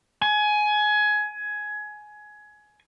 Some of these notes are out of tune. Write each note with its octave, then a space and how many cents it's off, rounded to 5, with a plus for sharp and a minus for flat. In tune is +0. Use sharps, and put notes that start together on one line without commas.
G#5 +20